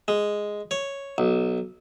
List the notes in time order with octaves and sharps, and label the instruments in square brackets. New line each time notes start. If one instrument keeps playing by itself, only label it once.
[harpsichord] G#3
C#5
B1